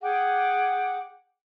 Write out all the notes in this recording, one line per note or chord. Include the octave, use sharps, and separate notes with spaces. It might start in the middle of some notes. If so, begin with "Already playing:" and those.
G#4 F#5 G5 D6